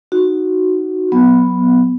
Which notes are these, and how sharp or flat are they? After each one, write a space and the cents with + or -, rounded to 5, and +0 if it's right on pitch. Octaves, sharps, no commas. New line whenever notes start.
D#4 +0 F#4 +0
F#3 -15 B3 +0